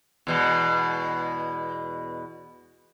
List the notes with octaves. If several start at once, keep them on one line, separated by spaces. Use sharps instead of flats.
E2 B2 G#3